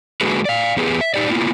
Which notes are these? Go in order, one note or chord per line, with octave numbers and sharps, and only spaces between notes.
D3 G#3 A#3 F#4 G#4 B4
D5 F5
E2 B3 G4 G#4 B4
E5
D#4 G4 D5
A#3 B3 E4 F4